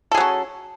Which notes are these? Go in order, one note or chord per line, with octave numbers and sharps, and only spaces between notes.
F#3 C#4 G#4 A4